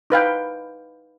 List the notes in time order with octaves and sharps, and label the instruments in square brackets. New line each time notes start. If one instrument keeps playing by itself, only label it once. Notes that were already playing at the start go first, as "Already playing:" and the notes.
[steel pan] D#4 B4 F5 G5